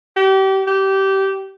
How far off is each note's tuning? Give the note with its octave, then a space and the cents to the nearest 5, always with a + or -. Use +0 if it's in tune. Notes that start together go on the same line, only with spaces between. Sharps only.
G4 -30
G4 -20